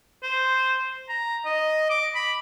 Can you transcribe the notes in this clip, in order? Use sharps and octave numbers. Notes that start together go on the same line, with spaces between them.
C5
A#5
D#5
D6
B5